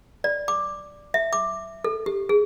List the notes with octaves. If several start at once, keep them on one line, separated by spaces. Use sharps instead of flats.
D5
D6
E5
D6
A4
G4
G#4